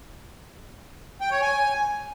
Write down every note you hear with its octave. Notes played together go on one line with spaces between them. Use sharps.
G5
C#5
G#5